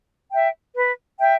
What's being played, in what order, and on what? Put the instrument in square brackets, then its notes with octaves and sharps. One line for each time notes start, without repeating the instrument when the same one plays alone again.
[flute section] E5 G5
B4
E5 G5